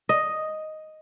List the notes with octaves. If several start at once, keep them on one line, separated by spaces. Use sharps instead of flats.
D#5